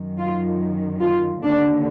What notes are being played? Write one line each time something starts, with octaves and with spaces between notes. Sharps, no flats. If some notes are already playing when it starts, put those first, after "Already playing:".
Already playing: F#2 D#3
F4
F4
D#2 D3 D4